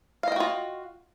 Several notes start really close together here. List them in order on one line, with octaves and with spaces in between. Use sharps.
F5 D#5 G5 F#4 F4